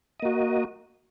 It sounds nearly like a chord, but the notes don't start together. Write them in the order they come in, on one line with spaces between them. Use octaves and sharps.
D#5 A#3 F#4